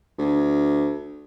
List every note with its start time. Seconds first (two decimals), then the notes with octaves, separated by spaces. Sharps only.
0.18 D2